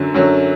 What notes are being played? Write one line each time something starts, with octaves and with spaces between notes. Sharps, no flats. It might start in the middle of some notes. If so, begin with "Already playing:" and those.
Already playing: F#2 D3 F#3
F#2 D3 F#3